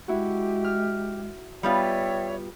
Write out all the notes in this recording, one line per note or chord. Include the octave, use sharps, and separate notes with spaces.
G#3 E4 F#4 G4
F6
G3 B3 F4 C#5 D5 E5 G5